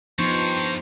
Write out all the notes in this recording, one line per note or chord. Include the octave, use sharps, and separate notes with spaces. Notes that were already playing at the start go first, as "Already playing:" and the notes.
G2 F3 B3 D#4 C5 C#6